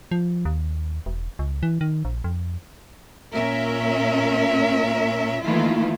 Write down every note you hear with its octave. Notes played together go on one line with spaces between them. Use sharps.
F3
D#2
E1
C#2
E3
D#3
A#1
F2
A#2 C#4 A#4 E5
D#3 E3 A3 A#3 E4 F4